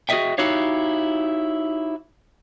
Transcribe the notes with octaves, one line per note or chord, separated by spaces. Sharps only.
F#4 G#4 A#4 D#5 E5 G5
D#4 E4 F#4 G4 C#5 F5